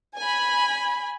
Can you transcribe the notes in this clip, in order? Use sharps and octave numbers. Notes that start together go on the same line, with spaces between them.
G#5 B5